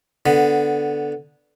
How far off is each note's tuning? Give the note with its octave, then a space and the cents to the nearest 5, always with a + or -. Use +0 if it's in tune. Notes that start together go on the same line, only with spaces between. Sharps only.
D3 +0 B3 +0